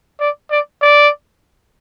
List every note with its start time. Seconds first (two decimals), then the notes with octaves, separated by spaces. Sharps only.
0.20 D5
0.50 D5
0.82 D5